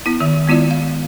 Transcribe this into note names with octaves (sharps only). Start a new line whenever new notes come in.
B3 E4
D#3 E5
G#3 B3 E4 F4 D5
F5